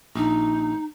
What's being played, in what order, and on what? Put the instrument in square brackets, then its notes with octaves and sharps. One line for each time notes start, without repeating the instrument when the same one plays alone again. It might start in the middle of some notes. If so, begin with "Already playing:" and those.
[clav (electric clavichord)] A#1 [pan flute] D#4